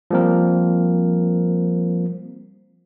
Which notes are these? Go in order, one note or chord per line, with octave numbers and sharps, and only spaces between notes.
F3 G3 A#3 C4 A#4